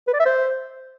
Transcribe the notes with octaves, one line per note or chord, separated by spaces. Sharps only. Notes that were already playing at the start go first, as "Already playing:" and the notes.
B4
D5
E5
C5